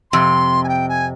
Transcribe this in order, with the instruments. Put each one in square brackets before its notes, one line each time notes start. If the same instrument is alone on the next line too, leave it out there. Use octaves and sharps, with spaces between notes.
[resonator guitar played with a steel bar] F2 C3 [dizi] C6
[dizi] G#5
G5
G#5